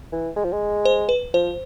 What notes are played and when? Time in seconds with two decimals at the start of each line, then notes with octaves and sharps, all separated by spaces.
0.12 E3
0.36 G#3
0.44 F3
0.53 G#3
0.85 C5
1.09 B4
1.34 F3 C5